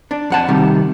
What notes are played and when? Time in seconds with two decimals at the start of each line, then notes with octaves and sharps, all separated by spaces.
0.11 D4
0.30 F2 F#5 A5
0.48 C3 D#3 G3